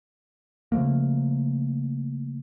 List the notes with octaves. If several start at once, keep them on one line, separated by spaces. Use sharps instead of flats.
C#3 F3 A3 A#3